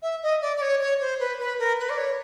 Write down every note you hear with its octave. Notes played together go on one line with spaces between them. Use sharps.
E5
D#5
D5
D5
C#5
C#5
C5
B4
B4
A#4
B4
D5
C#5